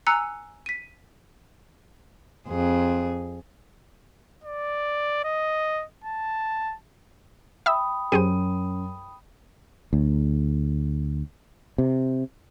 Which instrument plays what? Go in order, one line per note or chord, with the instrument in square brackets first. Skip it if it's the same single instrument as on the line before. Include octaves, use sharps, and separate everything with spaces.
[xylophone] G#5 A#5 E6 F#6 C#7
B6 D#7
[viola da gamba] F2 G#4
[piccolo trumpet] D5
D#5
A5
[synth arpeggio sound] E5 G#5 E6 [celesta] G5 B5 D#6
[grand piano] F#2 D#7 [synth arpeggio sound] G4 G#4 C5
[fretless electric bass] D2
C3